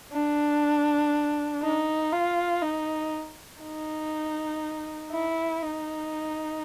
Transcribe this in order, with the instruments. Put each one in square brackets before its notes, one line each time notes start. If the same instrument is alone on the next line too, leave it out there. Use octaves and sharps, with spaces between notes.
[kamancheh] D4
D#4
F4
D#4
D#4
E4
D#4